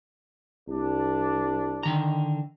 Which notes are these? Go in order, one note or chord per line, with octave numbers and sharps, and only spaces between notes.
C2 D4
D3 D#3 A#5